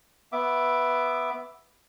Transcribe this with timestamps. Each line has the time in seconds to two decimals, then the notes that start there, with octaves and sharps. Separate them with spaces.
0.32 B3 E5 D6